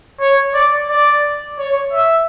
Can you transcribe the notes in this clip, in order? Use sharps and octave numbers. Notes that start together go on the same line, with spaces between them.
C#5
D5
D5
C#5
E5